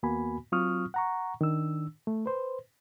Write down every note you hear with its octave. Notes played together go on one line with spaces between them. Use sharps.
D#2 A#3 B3 F#4 G#5 B5
F#3 C4 F4 C#6 D#6 F6
F#5 A#5 C#6
D#3 D4 E6
A3
B4 C5